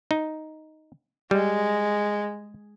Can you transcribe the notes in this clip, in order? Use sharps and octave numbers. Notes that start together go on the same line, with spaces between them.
D#4
G3 G#3